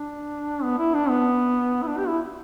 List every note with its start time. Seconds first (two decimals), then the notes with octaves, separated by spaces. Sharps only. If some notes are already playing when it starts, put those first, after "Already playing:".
Already playing: D4
0.63 B3
0.79 E4
0.94 D4
1.09 B3
1.83 E4
1.87 D4
1.97 G4
2.08 E4